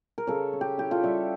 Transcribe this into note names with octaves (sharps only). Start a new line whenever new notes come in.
A#4
C#3 A4 C#5
C#4
G4
E4 G4
F4 A4
G3 C#5 E5